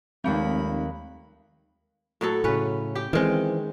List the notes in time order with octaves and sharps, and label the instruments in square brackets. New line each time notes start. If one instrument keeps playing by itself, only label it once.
[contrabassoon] F1 [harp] D#2 G3 G6 [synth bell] G#3 F5 [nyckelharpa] B5
[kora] A2 F#3 A4
[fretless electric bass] A2 C#3 [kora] C#4 B4
[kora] G4
[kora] D#3 G#3 [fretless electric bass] E3 C4